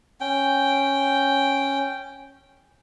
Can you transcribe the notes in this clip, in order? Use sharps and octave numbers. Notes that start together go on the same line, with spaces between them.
C#4 G5